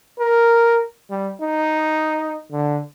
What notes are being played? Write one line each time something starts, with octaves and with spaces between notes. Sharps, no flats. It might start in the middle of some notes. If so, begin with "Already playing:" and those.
A#4
G3
D#4
D3